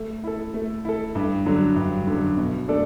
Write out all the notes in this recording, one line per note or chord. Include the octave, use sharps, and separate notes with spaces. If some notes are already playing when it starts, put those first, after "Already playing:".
Already playing: A3
E4 A4
A3
E4 A4
G2
D3 F#3
G2
D3 F#3
B2
A3 D4 A4 D5